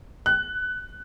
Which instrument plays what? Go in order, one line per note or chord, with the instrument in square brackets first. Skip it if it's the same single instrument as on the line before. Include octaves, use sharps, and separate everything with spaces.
[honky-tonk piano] F#6